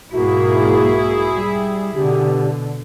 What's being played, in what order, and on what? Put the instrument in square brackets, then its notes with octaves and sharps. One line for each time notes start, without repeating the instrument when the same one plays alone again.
[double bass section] B1 G#2 A#3 [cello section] E4 G#4 [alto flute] F#4
[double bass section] G3
[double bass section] B2 D3 [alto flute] G4